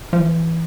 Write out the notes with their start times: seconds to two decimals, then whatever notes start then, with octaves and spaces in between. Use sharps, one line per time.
0.13 F3
0.20 E3